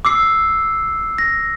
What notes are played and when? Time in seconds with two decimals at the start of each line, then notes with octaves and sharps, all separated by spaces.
0.05 D6 E6 C7
1.18 A#6